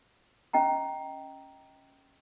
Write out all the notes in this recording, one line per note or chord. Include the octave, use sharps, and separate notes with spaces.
C#4 D#5 G5 A#5